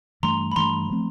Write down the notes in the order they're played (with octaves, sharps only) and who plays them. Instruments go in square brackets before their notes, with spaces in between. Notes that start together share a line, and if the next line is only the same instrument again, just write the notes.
[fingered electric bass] G2 E3 A3 [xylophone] A#5 C6
[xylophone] B5
[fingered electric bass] G2 E3 A3 [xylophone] A#5 C6
[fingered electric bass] F3 A3 C4